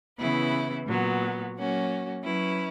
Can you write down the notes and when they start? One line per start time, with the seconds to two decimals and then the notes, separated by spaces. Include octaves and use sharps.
0.17 C#3 E3 B3 E4 B4
0.87 A#2 F#3 B3
1.55 F#3 A#3 C#4 F#4
2.23 F#3 C#4 E4 B4